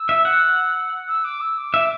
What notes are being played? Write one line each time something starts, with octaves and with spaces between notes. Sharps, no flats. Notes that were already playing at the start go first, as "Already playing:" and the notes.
Already playing: E6
E5
F#5
E6
D6
E6
D6
E5